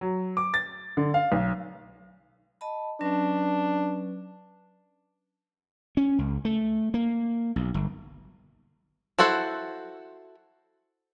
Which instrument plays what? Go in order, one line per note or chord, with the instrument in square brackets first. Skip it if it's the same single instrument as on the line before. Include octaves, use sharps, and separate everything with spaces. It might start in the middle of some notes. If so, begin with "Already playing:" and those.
[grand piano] F#3
D6
A6
D3
F5
B1
[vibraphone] D#5 A5 B5
[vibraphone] F#3 C#4 B4 [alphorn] D4
[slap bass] C#4
C#2
A3
A#3
B1
G1
[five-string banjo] E4 F#4 A4 C5 F#5